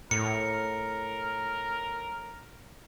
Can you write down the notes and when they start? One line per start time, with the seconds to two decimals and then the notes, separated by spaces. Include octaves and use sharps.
0.11 A2 A#4 C#7